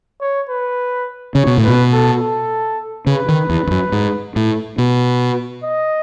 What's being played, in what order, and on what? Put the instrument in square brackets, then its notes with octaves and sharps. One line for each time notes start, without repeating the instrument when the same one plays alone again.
[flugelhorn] C#5
B4
[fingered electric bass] C#3 [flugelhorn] C#5
[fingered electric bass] B2
A2
[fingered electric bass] B2 [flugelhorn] B4
[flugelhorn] A4
A4
[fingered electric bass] C#3 [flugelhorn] B4
[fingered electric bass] D#3
E2
E2
F#2
G#2
A2
[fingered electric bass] B2 [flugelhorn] B4
[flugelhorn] D#5